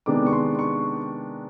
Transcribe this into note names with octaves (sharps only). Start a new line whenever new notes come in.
C3 D#3 G#3 B3 D4 D6
C#6
C6
C#6